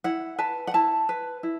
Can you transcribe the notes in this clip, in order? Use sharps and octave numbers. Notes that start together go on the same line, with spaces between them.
E4 F#5
B4 A5
F#5
E4 A5
B4
E4